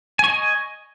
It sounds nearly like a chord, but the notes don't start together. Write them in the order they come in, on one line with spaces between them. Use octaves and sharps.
G#5 C#6 D#5